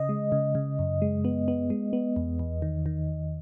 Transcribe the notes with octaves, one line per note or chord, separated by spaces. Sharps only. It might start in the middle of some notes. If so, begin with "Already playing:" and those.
Already playing: C#3 D#5
G#3
C#3
C#3
F#2
G#3
B3
B3
G#3
B3
E2
E2
D#3
D#3